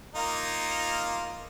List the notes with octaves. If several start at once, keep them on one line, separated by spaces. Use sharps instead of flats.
A#3 D#4 F4